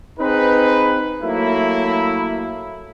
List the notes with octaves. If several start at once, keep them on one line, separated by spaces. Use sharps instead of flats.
C4 D#4 G#4 B4
F#3 A3 A#3 E4